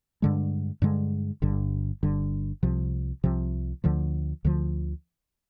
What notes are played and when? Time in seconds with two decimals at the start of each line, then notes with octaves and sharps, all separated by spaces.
0.22 G2 D3 G#3
0.82 G2 D3 G#3
1.42 G1 G2 D3
2.03 G1 G2 D3
2.63 C2 C3 F3
3.24 C2 C3 F3
3.84 D2 D3 F3
4.45 D2 D3 F3